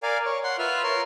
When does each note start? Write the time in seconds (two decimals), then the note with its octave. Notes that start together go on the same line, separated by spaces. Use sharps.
0.03 A#4 D5 F5 G#5
0.25 C#5
0.44 F#5 C6
0.59 F4 B4 E5 F6
0.83 A#4 C#5 C6